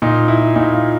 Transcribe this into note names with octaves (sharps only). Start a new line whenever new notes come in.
A#2 D#4
E4
A#2 D#4
F4